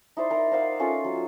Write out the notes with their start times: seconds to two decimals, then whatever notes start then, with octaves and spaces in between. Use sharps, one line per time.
0.17 D#4 E4 C5 D5
0.30 A#4 A#5
0.52 A#4 C5 F5 F#5
0.80 C#4 F4 A4
1.04 F#3